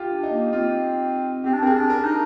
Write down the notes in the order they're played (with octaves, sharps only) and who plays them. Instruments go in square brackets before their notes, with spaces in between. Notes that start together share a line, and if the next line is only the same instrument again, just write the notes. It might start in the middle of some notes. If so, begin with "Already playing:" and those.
Already playing: [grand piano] F4 G4
[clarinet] D4
[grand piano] D#4
[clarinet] A#3
[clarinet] C4 [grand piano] F4
[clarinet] C4 [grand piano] G4
[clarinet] D4
[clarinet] C4 [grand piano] A#4
[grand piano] G#4
[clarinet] D4
[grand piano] A#4
[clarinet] D#4